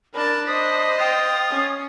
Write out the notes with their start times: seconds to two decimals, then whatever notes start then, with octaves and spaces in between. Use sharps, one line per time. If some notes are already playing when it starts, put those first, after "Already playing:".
0.14 D4 A#4 A5 B5
0.47 C5 D#5 B5 D#6
0.98 F4 G5 D#6
1.50 C#4